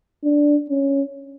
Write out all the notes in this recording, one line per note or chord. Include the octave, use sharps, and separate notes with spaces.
D4
C#4